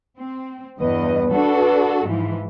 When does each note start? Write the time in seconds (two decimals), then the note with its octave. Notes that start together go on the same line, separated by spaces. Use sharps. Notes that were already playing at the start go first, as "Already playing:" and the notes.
0.19 C4
0.80 E2 G2 B4 D#5
1.32 D4 F#4 A4
2.05 G#2 E3 F3